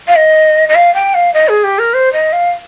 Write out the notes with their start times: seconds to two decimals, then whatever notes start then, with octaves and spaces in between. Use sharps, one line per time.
0.08 F5
0.16 D#5
0.69 D#5
0.75 F5
0.95 G5
1.14 F5
1.34 D#5
1.49 G#4
1.64 G4
1.79 A#4
1.94 C5
2.13 D#5
2.33 F5